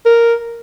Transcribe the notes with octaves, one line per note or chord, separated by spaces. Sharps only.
A#4